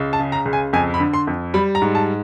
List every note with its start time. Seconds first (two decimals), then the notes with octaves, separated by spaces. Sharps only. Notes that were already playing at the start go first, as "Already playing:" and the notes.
Already playing: C#2
0.13 A5
0.20 C#3
0.32 A#5
0.45 C#2
0.53 G#5
0.73 F2 G#5
0.94 B5
1.00 D3
1.14 C6
1.27 F2
1.54 G3 B5
1.75 A#5
1.82 G#2
1.95 A5